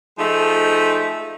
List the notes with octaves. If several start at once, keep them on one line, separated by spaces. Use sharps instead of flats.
F3 G#3 A3 D#4